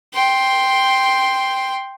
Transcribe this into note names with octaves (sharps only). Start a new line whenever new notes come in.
G5 C6